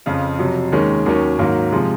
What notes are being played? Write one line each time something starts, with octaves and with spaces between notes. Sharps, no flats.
F2 C#3 F3
F2 C3 F#3
D#2 D#3 G#3 C#4
D#2 D#3 F#3 C#4
G#2 D#3 F#3 A#3
C3 F3 G#3